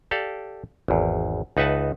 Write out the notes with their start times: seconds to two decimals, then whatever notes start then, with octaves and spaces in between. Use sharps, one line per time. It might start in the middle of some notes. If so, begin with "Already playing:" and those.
0.11 G4 A4 D5 F5
0.88 G#1 E2
1.57 C#2 D#4 B4 E5 F#5 A5